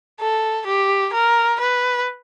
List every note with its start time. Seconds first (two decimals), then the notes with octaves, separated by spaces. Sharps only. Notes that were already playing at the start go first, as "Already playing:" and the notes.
0.20 A4
0.66 G4
1.13 A#4
1.60 B4